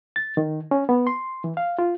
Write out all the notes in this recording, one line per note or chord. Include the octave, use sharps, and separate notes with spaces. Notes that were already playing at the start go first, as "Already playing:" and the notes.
A6
D#3
C#4
B3
C6
E3
F5
F4